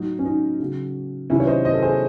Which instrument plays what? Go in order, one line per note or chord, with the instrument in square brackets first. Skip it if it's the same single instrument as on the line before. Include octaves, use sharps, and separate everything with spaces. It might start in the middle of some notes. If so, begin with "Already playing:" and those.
Already playing: [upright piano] A2 F#3 D#4
C#4
D#4
C#3 F#3
C3 D#3 F#3 C#4 E4
C#5
C5 D#5
C5 D#5
A4
G#4 C5